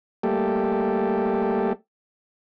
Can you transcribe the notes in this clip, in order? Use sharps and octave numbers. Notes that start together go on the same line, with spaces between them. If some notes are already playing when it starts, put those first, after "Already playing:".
G3 A3 A#3 G4 A4